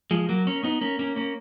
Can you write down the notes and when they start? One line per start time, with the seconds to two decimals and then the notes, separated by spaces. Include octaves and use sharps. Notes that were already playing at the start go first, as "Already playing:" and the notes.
0.11 F3 G#3
0.29 F#3 A#3
0.47 A#3 C#4
0.63 B3 D#4
0.81 A#3 C#4
0.99 A#3 C#4
1.16 A#3 C#4